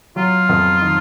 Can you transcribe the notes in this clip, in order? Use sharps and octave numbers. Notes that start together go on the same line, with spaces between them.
F#3 F4
F2
D#3